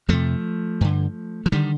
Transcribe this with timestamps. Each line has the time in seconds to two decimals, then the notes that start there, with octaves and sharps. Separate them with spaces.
0.08 F2 C3 F3 A3
0.81 G2 D3
1.46 F3
1.52 D3 D#3 G3